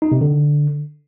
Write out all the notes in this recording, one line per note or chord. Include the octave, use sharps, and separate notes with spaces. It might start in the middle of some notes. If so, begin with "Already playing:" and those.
D#4
C3
D3